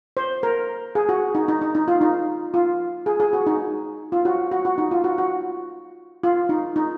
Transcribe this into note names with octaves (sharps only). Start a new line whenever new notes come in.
C5
A#4
G#4
F#4
D#4
D#4
D#4
D#4
F4
D#4
F4
G#4
G#4
F#4
D#4
F4
F#4
F#4
F#4
D#4
F4
F#4
F#4
F4
D#4
D#4